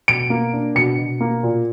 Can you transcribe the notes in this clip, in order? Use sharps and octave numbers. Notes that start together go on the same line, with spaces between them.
B2 D7
A#3
D4
B2 C#7
B2
A#3
A#2